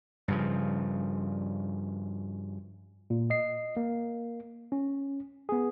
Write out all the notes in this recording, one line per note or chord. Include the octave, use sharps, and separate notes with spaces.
G2 C#3 F3
A#2
D#5 C7
A#3
C#4
B3 G#4